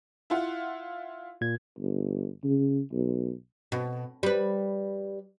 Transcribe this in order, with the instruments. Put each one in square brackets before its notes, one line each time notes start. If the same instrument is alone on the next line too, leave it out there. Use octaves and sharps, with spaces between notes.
[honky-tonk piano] E4 F4 F#5
[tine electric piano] A#2 G#6
[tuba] G1
C#3
B1
[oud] B2
G3 B4